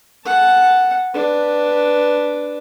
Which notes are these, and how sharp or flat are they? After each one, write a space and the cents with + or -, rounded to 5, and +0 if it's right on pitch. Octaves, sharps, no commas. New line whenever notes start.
F#5 +0 A5 +0
D4 +0 B4 +0